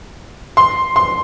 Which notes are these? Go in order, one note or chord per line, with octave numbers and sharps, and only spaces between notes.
C6
C6